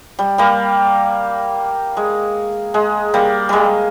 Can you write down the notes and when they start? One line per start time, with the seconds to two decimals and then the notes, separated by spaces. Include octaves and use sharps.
0.19 G3
0.38 G3 A#3
1.97 G#3
2.74 G#3
3.14 G3 A#3
3.49 G3 G#3